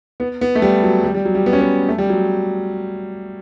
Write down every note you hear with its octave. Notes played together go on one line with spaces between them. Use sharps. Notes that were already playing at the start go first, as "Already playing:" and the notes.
B3
B3
A3
G3
F#3
G3
G3
F#3
G3
B3
C#4
B3
A3
G3
F#3